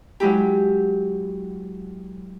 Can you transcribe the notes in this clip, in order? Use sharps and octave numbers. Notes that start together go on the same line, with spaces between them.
F#3 G#3 E4 G4